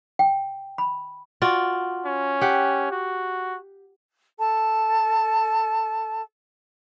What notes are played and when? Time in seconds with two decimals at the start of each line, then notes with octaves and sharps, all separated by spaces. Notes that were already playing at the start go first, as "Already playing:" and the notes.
0.19 G5
0.78 B5
1.42 F4 F#4 D5
2.06 C#4
2.41 G4 F#5
2.92 F#4
4.38 A4 A5